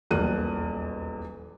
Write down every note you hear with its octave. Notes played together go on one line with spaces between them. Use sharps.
D#1 B1 E2 A#4 F#6 D#7